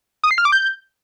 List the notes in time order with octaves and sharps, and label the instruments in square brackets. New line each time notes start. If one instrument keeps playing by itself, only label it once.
[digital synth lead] D#6
C7
F6
D6
G6